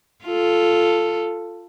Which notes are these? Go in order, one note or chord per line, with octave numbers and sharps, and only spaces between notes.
F4 A4